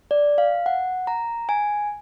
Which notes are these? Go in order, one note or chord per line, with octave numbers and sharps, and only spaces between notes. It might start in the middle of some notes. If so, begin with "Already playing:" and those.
D5
F5
F#5
A#5
G#5